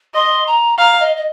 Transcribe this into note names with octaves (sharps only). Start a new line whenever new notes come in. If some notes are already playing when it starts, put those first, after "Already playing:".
D#5 C6
A#5
F5 A#5
D#5
D#5